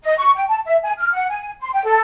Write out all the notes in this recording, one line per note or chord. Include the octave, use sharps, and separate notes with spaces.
D#5
C#6
G5
A5
E5
G#5
F6
F#5
G#5
C6
G5
A4